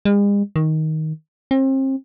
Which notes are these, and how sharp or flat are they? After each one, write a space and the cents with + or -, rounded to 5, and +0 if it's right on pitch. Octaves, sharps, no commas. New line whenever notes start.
G#3 -45
D#3 +10
C4 +35